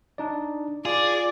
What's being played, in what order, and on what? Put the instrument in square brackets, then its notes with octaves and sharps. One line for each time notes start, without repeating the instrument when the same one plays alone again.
[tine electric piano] D4 D#4 D5
[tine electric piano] F4 [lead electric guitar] G#4 [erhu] D5